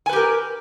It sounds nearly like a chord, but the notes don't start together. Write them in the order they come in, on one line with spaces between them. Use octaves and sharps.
G#5 B4 G4 A#4